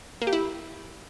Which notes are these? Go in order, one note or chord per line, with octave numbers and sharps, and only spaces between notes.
A#3
G4
E4